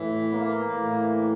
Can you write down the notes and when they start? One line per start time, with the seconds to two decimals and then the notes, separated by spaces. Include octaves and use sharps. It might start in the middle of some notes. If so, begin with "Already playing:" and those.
Already playing: A2 E3
0.32 A#3
0.77 A2 E3